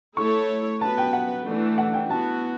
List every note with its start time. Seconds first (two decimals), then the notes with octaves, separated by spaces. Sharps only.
0.17 A3 E4 A4 C#5 C#6
0.81 B3 F#4 B4 A5
0.98 G5
1.13 F#5
1.45 E3 A3 D4
1.78 F#5
1.94 G5
2.09 E3 B3 F#4 A5